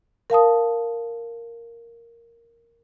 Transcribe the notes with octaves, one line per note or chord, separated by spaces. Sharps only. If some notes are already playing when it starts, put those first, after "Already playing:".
A#4 F5 A5 D#6